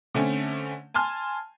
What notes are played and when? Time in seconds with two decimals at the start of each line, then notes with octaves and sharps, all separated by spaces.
0.15 D3 A3 C4 C#4
0.94 G#5 A5 C6 F6